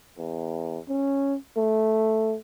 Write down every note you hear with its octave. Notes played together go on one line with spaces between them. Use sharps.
E2
C#4
A3